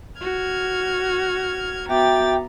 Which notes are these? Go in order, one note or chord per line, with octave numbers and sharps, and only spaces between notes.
F#4 F6 G#6
B3 F#4 E5 G5 A#5 D6 A6